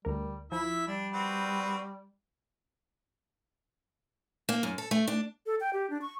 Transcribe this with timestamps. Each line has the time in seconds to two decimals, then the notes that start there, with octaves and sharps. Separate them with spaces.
0.05 D2 G3 A#4
0.52 F3 E4 E5
0.87 G3 D4
1.13 C4 F#4 B4
4.49 A#3
4.63 F#2
4.78 A4
4.91 A3
5.07 D4
5.46 A4
5.60 G5
5.73 G4
5.90 D4
6.01 C#6